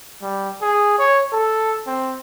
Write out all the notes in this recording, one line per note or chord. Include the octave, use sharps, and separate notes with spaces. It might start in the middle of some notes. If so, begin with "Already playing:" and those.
G3
G#4
C#5
A4
C4